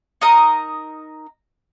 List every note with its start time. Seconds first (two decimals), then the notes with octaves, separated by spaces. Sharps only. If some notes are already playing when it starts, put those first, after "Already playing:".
0.21 D#4 A#4 D#5 A#5